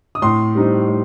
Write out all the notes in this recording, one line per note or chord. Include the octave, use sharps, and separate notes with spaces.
D#6
A2 C6
G3 C4 D#4
A2